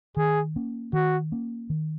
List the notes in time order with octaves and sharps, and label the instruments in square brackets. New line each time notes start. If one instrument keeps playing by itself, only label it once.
[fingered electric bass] D#3 [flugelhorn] G#4
[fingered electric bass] A#3 C#4
[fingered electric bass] D#3 [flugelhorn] F#4
[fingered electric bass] A#3 C#4
D#3